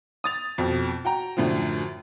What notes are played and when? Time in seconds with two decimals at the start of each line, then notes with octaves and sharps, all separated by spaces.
0.24 D#6 A6 F7
0.58 F2 B2
1.05 F#4 G5 A#5
1.37 F#2 A2 D3 F3